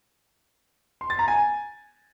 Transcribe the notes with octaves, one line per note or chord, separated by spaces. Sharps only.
C6
A6
A#5
G#5